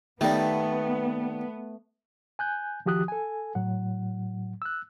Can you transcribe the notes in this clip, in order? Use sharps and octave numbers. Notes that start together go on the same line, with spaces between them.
D#3 G3 A3 B3
G#5 F#6 G6
D#3 F3 F#4 G4 D#6 F#6
A4 G#5
A2 F#3 F#5
E6 F#6